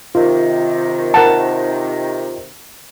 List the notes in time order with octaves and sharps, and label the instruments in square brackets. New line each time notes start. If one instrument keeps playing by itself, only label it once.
[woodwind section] C3 D#3 [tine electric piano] F4
[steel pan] A#4 F#5 A5